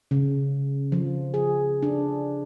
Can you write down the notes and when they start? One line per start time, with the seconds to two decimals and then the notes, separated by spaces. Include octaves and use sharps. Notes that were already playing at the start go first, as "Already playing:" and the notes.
0.11 C#3
0.92 F3
1.34 G#4
1.83 D4